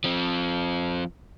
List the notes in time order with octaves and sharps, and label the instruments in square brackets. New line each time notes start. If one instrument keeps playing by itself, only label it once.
[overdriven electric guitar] F3 C4